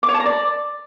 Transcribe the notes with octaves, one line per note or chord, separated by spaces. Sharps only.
D6
C#5
A5
A#5
D5